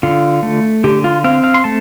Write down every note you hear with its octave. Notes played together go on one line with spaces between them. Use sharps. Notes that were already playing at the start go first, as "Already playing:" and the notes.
D3 F4
A3
D3 G4
F4
C4 F5
F5
C6
A3 A5